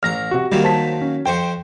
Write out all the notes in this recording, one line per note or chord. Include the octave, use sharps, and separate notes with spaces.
A1 A#5 F6 A#6
C3 F#4
D#3 F#3 G3 A#3
C5 A5 B6
C#4
F2 C5 G5 C#6